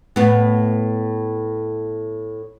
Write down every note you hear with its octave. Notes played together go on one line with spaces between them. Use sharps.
A2 B3